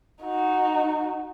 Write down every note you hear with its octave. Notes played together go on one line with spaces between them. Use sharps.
D#4 F#4